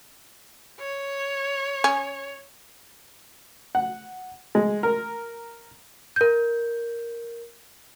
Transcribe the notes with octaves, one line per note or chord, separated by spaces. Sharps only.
C#5
C#4
F#5
G#3
A#4
A#4 G6